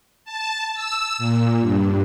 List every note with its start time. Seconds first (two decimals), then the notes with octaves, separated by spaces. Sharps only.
0.25 A5
0.74 E6
1.18 A#2
1.61 G2